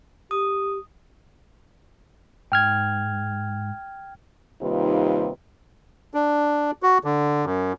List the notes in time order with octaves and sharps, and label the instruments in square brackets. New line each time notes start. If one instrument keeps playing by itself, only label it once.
[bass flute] G4 [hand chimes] D#6
[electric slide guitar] G#2 [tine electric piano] G5 F6 G#6
[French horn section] D#2 C3 G3 D#4 F4 B4
[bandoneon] D4
F#4
D3
F#2